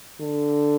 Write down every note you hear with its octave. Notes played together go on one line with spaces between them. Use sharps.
D3